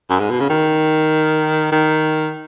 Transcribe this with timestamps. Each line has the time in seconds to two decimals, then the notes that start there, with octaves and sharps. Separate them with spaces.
0.10 F#2
0.20 G#2
0.30 B2
0.40 C#3
0.50 D#3
1.72 D#3